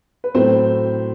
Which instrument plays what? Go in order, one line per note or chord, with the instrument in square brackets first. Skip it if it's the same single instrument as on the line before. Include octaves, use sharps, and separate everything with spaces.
[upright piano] B4
[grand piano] A2 F#3 A3 E4 [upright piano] C4 C5